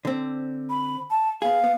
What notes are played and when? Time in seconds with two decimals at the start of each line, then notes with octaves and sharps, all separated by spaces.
0.05 D3 C4
0.70 B5
1.11 A5
1.42 B3 G#4 F5
1.64 B3